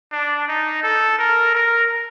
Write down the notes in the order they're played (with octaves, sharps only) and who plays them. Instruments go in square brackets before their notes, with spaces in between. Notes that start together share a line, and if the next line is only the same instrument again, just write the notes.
[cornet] D4
D#4
A4
A#4
A#4